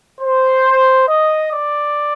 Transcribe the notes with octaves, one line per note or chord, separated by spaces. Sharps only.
C5
D#5
D5